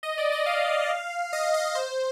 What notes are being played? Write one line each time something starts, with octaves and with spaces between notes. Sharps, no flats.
D#5
D5
D#5
F5
D#5
D#5
C5